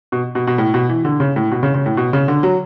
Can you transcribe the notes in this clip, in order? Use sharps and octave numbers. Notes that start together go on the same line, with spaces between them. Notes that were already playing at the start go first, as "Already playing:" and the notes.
B2
B2
B2
A2
B2
E3
D3
C#3
A2
B2
C#3
C#3
A2
B2
C#3
D3
F#3